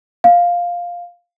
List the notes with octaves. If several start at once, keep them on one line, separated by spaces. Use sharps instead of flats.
F5